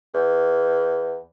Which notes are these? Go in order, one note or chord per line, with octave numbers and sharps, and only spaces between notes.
E2